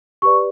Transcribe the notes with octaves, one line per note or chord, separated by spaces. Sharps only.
G4 B4 D5 C#6